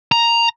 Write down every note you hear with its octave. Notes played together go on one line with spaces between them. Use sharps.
A#5